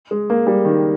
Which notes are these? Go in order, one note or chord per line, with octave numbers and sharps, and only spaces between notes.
G#3
A#3
G3
D#3